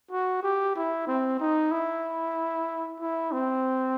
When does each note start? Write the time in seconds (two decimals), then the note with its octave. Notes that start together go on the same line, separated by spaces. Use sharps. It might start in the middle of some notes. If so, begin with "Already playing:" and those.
0.11 F#4
0.43 G4
0.76 E4
1.07 C4
1.40 D#4
1.71 E4
3.00 E4
3.32 C4